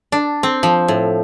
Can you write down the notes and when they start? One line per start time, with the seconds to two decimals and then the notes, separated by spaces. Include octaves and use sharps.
0.12 D4
0.43 C4
0.63 F3
0.88 A2